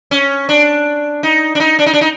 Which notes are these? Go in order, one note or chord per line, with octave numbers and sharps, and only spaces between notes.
C#4
D4
D#4
D4
D#4
D4
D#4
D4
D#4